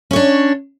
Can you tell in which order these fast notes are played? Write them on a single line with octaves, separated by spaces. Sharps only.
C#4 C#5 D4